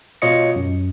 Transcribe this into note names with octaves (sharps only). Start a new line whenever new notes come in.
B2 F4 C#5 D#5 C#7
F#2